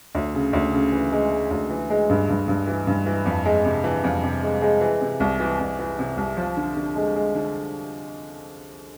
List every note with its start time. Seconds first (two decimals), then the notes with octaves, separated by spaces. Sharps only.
0.15 D2
0.34 C#3
0.53 D2
0.73 C#3
0.92 E3
1.12 G#3
1.31 G#3
1.51 D2
1.70 E3
1.90 G#3
2.09 G2
2.29 G2
2.48 G2
2.67 E3
2.87 G2
3.06 E3
3.26 F2
3.45 G#3
3.65 C3
3.84 E3
4.04 F2
4.23 C3
4.42 G#3
4.62 G#3
4.81 E3
5.01 C3
5.20 C2
5.40 E3
5.59 C2
5.79 E3
5.99 C3
6.17 C2
6.37 F3
6.57 D3
6.76 D3
6.96 G#3
7.16 G#3
7.35 D3